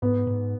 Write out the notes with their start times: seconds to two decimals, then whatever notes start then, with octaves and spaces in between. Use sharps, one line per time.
0.02 G#2 B3
0.27 G#2